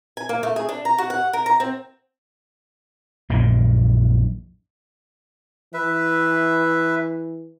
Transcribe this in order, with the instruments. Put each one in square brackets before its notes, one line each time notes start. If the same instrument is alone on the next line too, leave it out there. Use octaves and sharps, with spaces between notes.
[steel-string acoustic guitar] G#5
A#3
A3
G#4
D4
A#5
F#4
F#5
A#4
A#5
C4
[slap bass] A#1 F#2 A#2 D#3
[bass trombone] E3 [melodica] B4 E5